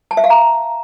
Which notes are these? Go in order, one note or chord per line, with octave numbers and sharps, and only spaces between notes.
A5
E5
F5
A#5